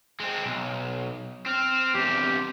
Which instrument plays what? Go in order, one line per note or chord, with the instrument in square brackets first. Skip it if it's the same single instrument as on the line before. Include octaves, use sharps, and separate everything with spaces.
[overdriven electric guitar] G#3 C4
B1
[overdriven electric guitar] C4 [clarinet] F6
[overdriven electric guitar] E2 C3 [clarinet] G4